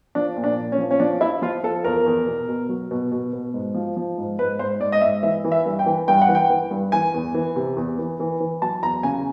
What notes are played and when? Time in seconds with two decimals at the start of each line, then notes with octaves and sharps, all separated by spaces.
0.15 F3 D4
0.37 A#2
0.44 D4
0.57 A#2
0.72 C#4
0.78 F3
0.91 C#4
1.00 F3 D4
1.21 F3 E4
1.42 F3 F4
1.64 F3 A4
1.84 E2 A#4
2.06 E2
2.26 B2
2.48 B2
2.69 F#3
2.91 B2
3.12 B2
3.33 B2
3.54 G#2
3.74 F3
3.97 F3
4.18 G#2
4.39 G#2 B4
4.59 G#2 C5
4.80 G#2 D5
4.92 D#5
5.01 G#2 E5
5.23 E3 E5
5.44 E3
5.52 E5
5.66 G2
5.79 G5
5.86 E3
6.08 G2 G5
6.22 F#5
6.29 E3
6.35 G5
6.50 E3
6.71 G2
6.92 E3 G#5
7.14 E2
7.34 E3
7.56 C3
7.77 E2
7.99 E3
8.20 E3
8.40 E3
8.62 F#3 A5
8.83 E2 A#5
9.03 C#3 G#5